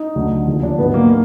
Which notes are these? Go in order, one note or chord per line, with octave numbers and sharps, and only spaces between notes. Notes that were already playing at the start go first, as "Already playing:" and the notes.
Already playing: D#4
D2 D3 F#3
D#2 D3 F3
D4
G#2 F#3 B3
A#3
A#3